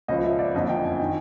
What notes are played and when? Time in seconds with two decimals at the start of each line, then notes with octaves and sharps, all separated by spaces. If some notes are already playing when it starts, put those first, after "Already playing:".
0.08 C#2 C#3 F3 D#5
0.24 E5
0.39 D5
0.54 F#1 F2 D3 D#5
0.69 G5
0.84 G#5
1.00 D#3 G5